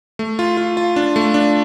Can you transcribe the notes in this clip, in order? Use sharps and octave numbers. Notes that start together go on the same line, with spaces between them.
A3
F4
F4
F4
D4
A3
D4